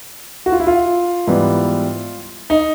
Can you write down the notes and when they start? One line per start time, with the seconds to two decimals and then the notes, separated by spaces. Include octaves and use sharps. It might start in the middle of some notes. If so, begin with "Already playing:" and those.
0.46 F#4
0.52 F4
0.60 E4
0.67 F4
1.27 G#2 E3 G3 B3
2.50 D#4